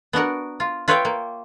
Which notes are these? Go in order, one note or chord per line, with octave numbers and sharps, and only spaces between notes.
B3 D4 F#4 A#4
F4
F4 B4 C#5 E5 F5 G5
A#3